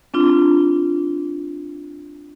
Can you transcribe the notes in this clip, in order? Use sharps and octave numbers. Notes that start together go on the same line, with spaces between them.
C4 D4 F4